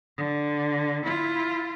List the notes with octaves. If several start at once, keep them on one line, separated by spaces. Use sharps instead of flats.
D3
E4 F4